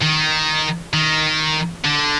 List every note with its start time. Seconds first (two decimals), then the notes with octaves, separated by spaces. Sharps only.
0.02 D#3
0.93 D#3
1.85 D3